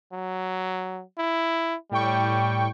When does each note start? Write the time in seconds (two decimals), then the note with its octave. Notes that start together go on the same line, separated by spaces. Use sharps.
0.12 F#3
1.18 E4
1.91 A2 G3 G5 C#6